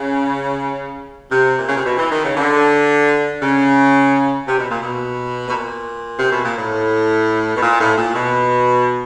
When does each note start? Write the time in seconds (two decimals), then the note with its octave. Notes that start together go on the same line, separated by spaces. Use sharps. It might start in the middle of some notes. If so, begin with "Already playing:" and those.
Already playing: C#3
1.31 C3
1.58 A#2
1.69 C#3
1.76 C3
1.84 B2
1.97 E3
2.11 D#3
2.24 C#3
2.37 D3
3.42 C#3
4.48 C3
4.58 B2
4.70 A#2
4.81 B2
5.48 B2
5.52 A#2
6.18 C3
6.31 B2
6.44 A#2
6.58 A2
7.56 B2
7.62 A#2
7.80 A2
7.97 A#2
8.15 B2